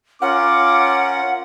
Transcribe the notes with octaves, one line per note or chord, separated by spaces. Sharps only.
C#4 F4 A#4 F#5 D6